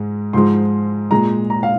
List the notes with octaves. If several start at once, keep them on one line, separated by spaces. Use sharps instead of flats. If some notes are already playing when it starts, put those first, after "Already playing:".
Already playing: G#2 G#3
G#2 F3 G#3 C6
A#2 G#3 A#5
A#5
F5